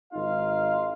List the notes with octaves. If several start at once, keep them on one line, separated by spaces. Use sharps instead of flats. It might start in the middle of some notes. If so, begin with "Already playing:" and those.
G#1 D#4 F4 F5